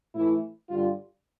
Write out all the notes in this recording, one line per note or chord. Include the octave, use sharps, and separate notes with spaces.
A2 E3 A3 E4
G2 D3 G3 F4